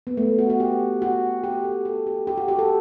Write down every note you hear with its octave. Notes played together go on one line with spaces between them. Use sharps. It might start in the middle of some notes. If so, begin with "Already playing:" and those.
B3
A3
F#4
F#4
G4
F#4
G4
A4
A4
G4
G4
F#4
G4
A4